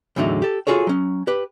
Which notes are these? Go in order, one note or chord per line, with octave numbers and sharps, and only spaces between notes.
E2 A2 D3 F#3 D#4 E5
G4 A4
F4 F#4 G#4 A4 C#5
F#3 C#4
G4 B4